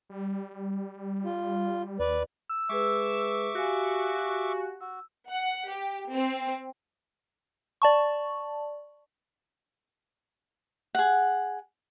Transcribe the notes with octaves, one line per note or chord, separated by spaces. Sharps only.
G3
F4
D#2 B4 D5
E6
G#3 G#4 B4 E5 C#6 D6
F#4 G4 F5 G#5
F#4 E6
F#5
G4
C4
D5 A5 C#6
G#4 F#5